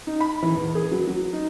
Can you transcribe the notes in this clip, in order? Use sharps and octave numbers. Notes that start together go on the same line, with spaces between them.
D#4
B5
E3
E2
G#4
F#3
F#3
D#4